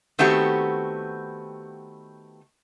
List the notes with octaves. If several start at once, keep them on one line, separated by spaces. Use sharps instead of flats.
D#3 A3 B3 C4 F#4 G4